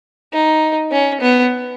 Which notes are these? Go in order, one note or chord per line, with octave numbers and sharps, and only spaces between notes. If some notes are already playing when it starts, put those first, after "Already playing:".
D#4
C#4
B3